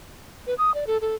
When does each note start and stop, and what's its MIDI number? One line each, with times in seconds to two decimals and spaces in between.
0.47 0.54 71
0.58 0.74 87
0.74 0.84 74
0.87 0.97 69
1.01 1.15 69